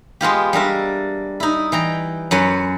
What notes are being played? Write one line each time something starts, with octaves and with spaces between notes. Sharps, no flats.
G#3 B3 F4 G4
G3 D4 A#4 E5
D#4 E4
E3 G5 A#5
F#2 F#3 B4 G#5